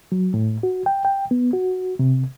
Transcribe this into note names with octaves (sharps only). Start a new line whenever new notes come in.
F#3
A2
F#4
G5
G5
B3
F#4
C3